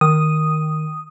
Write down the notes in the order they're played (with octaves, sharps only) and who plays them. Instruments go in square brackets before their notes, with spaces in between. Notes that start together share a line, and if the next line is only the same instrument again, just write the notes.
[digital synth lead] D#3 [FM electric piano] D#6